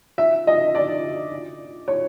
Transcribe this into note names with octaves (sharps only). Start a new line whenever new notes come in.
E5
D#5
D5
C#5